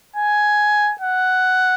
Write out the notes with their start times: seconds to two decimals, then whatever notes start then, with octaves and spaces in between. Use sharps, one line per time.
0.16 G#5
1.01 F#5